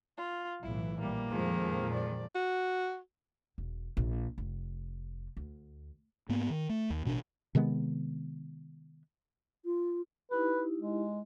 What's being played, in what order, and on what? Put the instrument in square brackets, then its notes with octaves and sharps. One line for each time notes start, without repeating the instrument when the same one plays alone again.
[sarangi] F4
[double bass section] B1 A2 E3 [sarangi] E4
[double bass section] A#1 [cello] G3 [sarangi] A#3
[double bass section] F2 A#2 F3 [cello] D#3 G#3
[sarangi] D5
[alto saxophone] F#4
[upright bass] E1
A#1
F1
D2
[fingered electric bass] G#2 A#3 B3
D#3
A3
D#2
A1 B2 C#4 D4
[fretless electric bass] C3 D#3 G#3 B3
[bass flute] F4
[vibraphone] D#4 E4 G4 [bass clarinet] B4
[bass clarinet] G#3